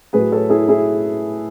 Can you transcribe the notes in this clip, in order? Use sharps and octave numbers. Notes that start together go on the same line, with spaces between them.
A2 F#3 G#4 B4
A4 C#5
E4 G#4
E4 G#4